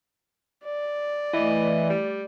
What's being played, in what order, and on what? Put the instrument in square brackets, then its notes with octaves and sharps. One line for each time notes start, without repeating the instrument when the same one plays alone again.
[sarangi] D5
[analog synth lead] E3 [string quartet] A3 [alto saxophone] D#5
[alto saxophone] G3